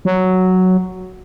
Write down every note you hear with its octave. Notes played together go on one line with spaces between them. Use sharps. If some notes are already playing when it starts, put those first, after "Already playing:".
F#3